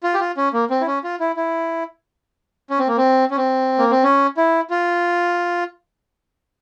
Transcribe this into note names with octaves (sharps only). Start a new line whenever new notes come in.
F4
G4
F4
C#4
A#3
C4
E4
C#4
F4
E4
E4
C#4
C4
A#3
C4
C#4
C4
A#3
C4
C#4
E4
F4